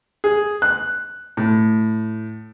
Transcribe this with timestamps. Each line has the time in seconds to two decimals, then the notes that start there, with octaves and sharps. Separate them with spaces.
0.24 G#4
0.62 F#6
1.37 A2